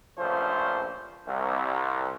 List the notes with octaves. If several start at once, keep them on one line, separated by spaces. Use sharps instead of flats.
A#1 G2 F3 A3 C#4 C5
C2